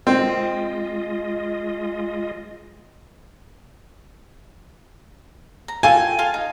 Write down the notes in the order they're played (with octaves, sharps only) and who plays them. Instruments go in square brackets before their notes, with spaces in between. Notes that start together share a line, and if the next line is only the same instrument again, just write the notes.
[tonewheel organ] G#3 F4 D#5 [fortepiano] C4
[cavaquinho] A#5
[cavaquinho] F4 A4 G5 [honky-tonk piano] G#5
[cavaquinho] F4 F5 A5
D#4